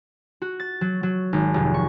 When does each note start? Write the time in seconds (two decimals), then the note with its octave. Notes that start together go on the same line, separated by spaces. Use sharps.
0.42 F#4
0.60 A6
0.81 F#3
1.03 F#3
1.33 G#1
1.54 F1
1.74 C#6